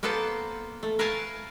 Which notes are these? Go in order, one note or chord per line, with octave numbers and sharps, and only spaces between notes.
A#3 B3 A4 B4 C5 A5
A3
A#4 B4 E5 F5 G#5 A5